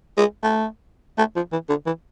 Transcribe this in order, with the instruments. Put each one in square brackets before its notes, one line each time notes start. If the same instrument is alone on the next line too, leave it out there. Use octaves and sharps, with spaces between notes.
[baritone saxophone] G#3
A3
A3
F3
E3
D3
E3